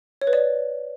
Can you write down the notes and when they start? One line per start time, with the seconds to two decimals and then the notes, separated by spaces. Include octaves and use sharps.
0.22 C#5
0.27 B4
0.33 D5